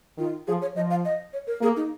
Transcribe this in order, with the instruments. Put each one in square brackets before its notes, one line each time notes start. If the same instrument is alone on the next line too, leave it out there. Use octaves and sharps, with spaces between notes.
[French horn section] D#3 [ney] F4
[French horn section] F3 [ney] G#4
[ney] C#5
[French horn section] F3 [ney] D#5
[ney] F5
D#5
C#5
A#4
[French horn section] A#3 [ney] G#4
[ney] D#4